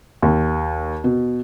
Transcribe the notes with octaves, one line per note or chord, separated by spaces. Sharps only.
D#2
B2